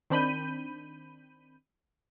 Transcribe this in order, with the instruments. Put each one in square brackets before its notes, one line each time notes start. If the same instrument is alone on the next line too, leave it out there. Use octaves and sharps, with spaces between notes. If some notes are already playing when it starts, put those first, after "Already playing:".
[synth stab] D#3 C4 D4 B5 G6 D#7